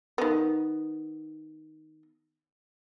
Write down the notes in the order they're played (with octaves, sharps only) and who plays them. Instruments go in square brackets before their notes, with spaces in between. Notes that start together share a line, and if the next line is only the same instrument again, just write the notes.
[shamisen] D#3 B3